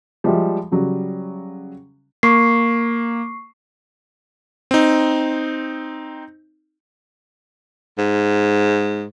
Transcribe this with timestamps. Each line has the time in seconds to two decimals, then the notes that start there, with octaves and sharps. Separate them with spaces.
0.24 F3 G3 G#3 F#4 G4 E5
0.72 C#3 F#3 G3
2.23 A#3 C#6 C7
4.71 C4 D#4
7.98 G#2